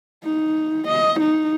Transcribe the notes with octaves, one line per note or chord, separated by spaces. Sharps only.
D#4
D#5
D#4